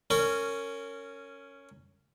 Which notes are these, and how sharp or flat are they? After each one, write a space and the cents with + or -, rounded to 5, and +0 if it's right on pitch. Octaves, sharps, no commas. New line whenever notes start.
C#4 +0 A#4 -25